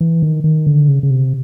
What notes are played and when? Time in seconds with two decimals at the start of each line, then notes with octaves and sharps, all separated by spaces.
0.01 E3
0.22 D#3
0.44 D#3
0.67 D3
0.88 C#3
1.03 C#3
1.10 C3